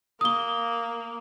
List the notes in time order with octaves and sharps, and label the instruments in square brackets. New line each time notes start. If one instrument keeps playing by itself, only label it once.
[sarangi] A#3 [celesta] D#6 G7